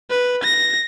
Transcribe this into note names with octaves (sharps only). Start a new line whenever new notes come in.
B4
A#6